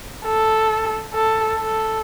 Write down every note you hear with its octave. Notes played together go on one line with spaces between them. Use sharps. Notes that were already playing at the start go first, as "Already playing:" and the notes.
A4
A4
A4